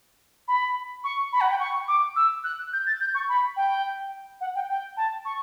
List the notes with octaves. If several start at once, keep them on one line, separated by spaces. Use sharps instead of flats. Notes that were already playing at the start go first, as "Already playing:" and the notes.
B5
C#6
B5
F#5
G5
C#6
D6
E6
F#6
G6
A6
G6
C#6
B5
G5
F#5
G5
G5
A5
C#6